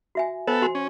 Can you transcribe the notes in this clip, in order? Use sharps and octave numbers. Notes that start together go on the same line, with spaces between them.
F#4 E5 G#5
B3 A4 C5 G#5
F#4 G#5 C6
C#4